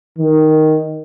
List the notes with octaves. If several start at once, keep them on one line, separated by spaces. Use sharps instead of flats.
D#3